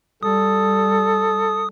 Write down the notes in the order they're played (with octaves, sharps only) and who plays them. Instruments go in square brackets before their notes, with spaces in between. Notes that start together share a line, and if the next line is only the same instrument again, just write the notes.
[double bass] G3 [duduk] A4 [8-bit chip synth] D#6